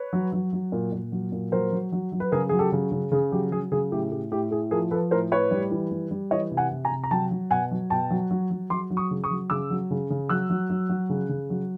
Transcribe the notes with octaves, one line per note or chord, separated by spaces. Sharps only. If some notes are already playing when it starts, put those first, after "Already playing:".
Already playing: B4 C#5
F#3
F#3
F#3
A#2
A#2
F#3
A#2
F#3 A#4 C5
F#3
F#3
F#3
B4
C#3 G#4 A#4
F#3 G#4
G4 A4
C#3
C#3
C#3 G#4
F#3 G4
F#3 G#4
C#3 G#4
A2 G4
A2 G4
A2 G4
A2 G#4
F3 G#4 A#4
F3 A4 B4
A2 A#4 C5
A2 B4 C#5
G3
E3
G3
G3
E3 C#5 D#5
C3
F#5 G#5
C3
G#5 A#5
C3
A#5
F#3 G5 A5
F#3
B2 F#5 G#5
F#3
B2 G5 A5
F#3
F#3
F#3
F#3 C6 D6
F#3
C#6 D#6
C#3
C#6 D#6
F#3
C#3 D6 E6
F#3
C#3
C#3
F#3 E6 F#6
F#3
F#3
F#3
C#3
C#3
F#3